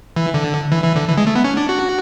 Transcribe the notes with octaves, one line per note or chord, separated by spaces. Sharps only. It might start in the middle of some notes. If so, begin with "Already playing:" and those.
E3
D3
E3
E3
D3
E3
G#3
A3
B3
C#4
D4
F#4